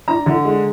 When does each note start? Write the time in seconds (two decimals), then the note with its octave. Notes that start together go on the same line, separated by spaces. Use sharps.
0.08 D4 A#5
0.26 D3
0.45 G#3